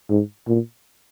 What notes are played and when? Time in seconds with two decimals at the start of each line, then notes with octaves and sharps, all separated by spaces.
0.10 G#2
0.47 A#2